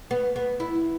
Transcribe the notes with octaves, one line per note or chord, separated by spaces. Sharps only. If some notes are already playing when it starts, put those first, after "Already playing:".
B3
B3
E4